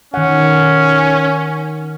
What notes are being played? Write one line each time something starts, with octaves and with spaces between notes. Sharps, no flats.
D#3 C#4 F#5